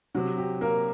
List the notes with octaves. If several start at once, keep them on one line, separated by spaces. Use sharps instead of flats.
C3 F#3 F#4
G4
A#3 A#4